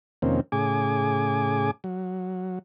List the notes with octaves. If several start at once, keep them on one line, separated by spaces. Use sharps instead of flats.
F2 C3 D#3 A#3 C4 C#4
A2 C#3 G#4 G#5 D6
F#3